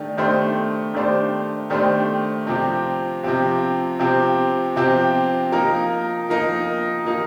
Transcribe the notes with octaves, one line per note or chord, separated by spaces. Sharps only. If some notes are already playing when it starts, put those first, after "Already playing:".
Already playing: D#3 A3 D4 G4
D#3 A3 D4 G4 C5
D#3 A3 D4 G4 C5
D#3 A3 D4 G4 C5
C3 F3 C4 G4
C3 F3 C4 G4
C3 F3 C4 G4
C3 F3 C4 G4
F3 A#3 D#4 A#4
F3 A#3 D#4 A#4
F3 A#3 D#4 A#4